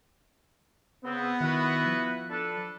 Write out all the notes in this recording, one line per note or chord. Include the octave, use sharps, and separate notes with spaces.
C#3 B3 C4
D#3 E4 F#4 B4
F3
D4 A4 B4